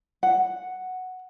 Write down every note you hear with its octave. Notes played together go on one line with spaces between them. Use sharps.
F#5